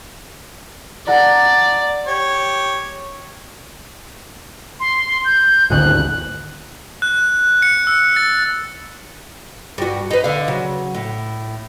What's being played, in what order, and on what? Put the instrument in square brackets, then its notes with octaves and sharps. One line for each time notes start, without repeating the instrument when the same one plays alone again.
[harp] A4 F#5 A#5 [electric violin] D5
[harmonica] G4 C#5
[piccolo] C6
G6
[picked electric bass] G#1 D2 [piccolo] F#6
[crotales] F#6
C#7
E6
A6
[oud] G2 F#4
D#4 B4
D3 F5
C#3 F#3
A2